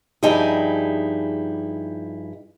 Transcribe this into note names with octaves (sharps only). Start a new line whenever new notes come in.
G2 F3 D#4 E4 G4 G#4